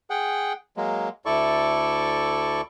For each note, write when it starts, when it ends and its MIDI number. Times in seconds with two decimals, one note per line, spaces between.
0.10 0.53 68
0.10 0.53 78
0.10 0.53 79
0.77 1.09 54
0.77 1.09 56
0.77 1.09 58
1.26 2.61 38
1.26 2.61 64
1.26 2.61 69
1.26 2.61 74
1.26 2.61 85